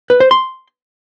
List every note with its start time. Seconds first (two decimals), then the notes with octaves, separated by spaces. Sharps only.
0.10 B4
0.20 C5
0.31 C6